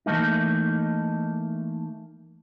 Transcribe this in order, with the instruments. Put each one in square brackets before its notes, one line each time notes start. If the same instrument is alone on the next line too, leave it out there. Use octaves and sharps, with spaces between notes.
[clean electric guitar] E3 F3 A3 A#3 D#4